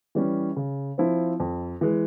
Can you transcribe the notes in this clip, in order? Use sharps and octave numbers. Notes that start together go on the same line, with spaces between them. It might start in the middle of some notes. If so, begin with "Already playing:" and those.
E3 G3 C#4
C#3
F3 C4 E4
F2
E3 G#3